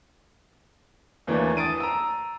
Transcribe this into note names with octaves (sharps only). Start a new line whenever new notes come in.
D#2 E3 A3 A#3 D4
A5 D#6 A6 D7 D#7
A#5 E6